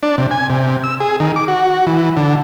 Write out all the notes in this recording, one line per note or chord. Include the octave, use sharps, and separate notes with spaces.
D4
C3
G#5
C3
E6
G#4
D#3
D6
F#4
E3
D3